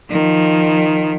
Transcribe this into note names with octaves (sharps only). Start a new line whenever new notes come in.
D#3 F3